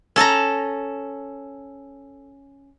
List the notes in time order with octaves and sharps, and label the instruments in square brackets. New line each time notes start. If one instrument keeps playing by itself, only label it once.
[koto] C#4 A4 A5 A#5